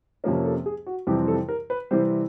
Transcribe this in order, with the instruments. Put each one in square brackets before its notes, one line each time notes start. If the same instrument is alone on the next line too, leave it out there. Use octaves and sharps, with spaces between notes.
[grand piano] F2 C3 F3 A#3 C#4 A#4
A4
G#4
F#4
F2 C3 E3 G3 C4 G4
A4
A#4
B4
C3 E3 G3 C4 C5